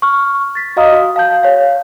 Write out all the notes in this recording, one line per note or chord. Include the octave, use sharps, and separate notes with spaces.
C#6 F6
A6 B6
F#4 D#5 F5 A#5 D#6 F6
F#4
F5 A5 G6
C#5 F5